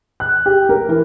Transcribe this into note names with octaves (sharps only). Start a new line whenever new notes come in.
F#6
G4
A#4
E3